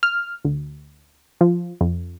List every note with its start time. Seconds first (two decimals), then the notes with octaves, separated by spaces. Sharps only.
0.03 F6
0.45 D2
1.41 F3
1.81 F2